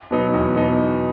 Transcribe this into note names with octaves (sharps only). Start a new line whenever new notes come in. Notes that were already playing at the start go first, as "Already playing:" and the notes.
B2 F#3 B3 D#4
E2
B2 F#3 B3 D#4